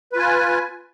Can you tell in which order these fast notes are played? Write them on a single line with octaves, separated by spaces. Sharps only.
B4 F4 G#5